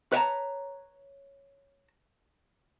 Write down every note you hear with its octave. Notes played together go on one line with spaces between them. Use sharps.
B4 C#5 D#5 G5 A5 A#5